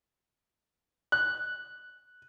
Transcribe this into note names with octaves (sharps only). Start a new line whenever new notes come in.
F#6